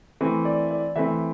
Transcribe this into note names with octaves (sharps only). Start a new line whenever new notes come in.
E3 A3 C4
D5
D5
E3 A3 C4 E5